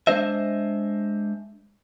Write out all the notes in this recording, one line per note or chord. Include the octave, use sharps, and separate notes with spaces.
G#3 D4 C5 D#5 E5